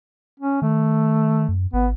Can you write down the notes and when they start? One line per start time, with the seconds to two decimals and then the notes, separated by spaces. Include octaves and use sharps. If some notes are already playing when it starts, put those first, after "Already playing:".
0.40 C#4
0.62 D#3 A3
1.49 F#2
1.73 G#1 B3